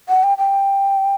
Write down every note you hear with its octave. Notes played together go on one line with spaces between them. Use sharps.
F#5
G5
G5